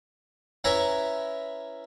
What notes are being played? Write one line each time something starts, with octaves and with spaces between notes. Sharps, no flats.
C#4 E4 B4 G#5 A#5